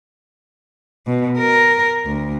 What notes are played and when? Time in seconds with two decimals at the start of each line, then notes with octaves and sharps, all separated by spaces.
1.07 B2
1.38 A#4
2.06 D2